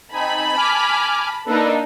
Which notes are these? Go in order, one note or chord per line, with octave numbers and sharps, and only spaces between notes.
C4 D#4 G#5 A5 B5
G#5 D6 F6
A#3 D4 D#4 A4 B4